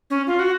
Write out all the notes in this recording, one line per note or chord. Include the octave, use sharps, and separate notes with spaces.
C#4
F4
F#4